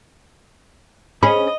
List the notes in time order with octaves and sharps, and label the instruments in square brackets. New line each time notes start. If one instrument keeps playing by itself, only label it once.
[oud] C#4 G#4 [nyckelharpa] D#5 [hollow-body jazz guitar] B5